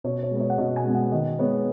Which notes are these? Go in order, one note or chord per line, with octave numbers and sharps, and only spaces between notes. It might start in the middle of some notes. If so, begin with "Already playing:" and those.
B2 C#5
C#5
G#3 B3
C#5
F#5
B2 D#5
G#5
G#3 B3
F#5
D#3 D#5
G#3 B3 C#5